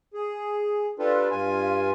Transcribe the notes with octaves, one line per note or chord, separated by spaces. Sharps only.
G#4
D4 F4 G4 A4 B4
G2 F4 G#5